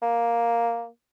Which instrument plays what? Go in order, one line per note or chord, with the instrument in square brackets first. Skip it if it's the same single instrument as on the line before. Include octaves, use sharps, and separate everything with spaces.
[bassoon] A#3